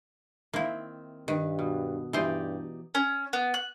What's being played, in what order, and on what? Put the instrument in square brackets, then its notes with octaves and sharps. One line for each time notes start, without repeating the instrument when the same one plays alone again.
[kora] D#3 C4 [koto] A#3 E4
[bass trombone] G2 [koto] D#3 [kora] B4
[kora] B2
[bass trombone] G2 [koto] E3 C5 [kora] D#4 G4 D5
[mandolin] C#4
B3
F#6